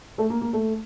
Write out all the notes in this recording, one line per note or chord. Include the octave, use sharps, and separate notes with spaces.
A3
A#3
A#3
A3